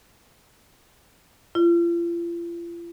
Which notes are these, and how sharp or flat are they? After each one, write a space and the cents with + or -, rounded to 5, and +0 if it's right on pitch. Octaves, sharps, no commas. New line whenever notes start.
F4 -40